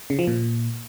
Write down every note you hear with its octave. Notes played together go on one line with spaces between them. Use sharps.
C#3
F3
A#2